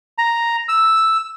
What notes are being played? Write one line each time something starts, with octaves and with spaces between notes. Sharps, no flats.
A#5
E6